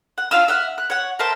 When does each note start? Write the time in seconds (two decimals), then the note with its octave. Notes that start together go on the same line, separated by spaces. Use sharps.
0.18 F#5
0.31 D4 F4 F5 E6
0.48 E5 F#5 F6
0.78 F#6
0.90 C#5 F#5
1.19 A#4 C5 E5 A5